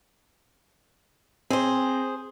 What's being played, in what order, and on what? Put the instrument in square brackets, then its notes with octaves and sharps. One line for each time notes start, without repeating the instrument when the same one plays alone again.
[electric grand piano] C4 [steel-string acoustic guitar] G#4 C5